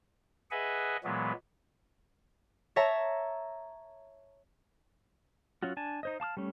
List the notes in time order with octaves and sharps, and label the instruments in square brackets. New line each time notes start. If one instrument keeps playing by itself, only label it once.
[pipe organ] G#4 B4 D#5 E5 F#5 G#5
A#2 E3 F#3 G#3 B3
[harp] C#5 E5 A5 A#5
[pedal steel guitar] F#3 C#4 F4 F#4
D4 G#5 A5
D#4 C5 D#5
F5 A5 D6 F6
G3 A3 C#4